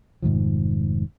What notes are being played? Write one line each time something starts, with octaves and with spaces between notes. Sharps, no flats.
F1 G#2 D#3 F3